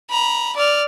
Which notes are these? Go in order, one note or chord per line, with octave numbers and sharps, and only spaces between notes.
A#5 B5
D5 F6